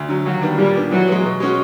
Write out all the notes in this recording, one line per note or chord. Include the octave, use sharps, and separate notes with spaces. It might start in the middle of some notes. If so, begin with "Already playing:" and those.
Already playing: D2
D3 F#3
D#2 F#3
D#3 G3 B3 D4
A#2 G3
G3 B3 D4
E3 F#3
G#3 B3
B2
G#3 C#4 F#4